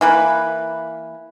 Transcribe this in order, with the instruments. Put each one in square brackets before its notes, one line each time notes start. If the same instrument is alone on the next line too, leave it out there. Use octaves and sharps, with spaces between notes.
[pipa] E3 A#3 B4